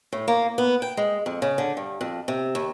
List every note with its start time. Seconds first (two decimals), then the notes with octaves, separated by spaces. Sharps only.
0.12 A2
0.28 A#3
0.58 B3
0.82 G5
0.97 G#3
1.26 F2
1.42 C#3
1.58 D3
1.77 G2
2.01 F2
2.28 C3
2.55 D#2